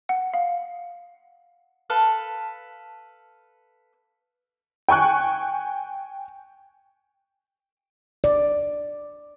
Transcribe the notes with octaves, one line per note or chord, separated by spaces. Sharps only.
F#5
F5
A4 B4 F5
G5 G#5 C#6 F#6
D5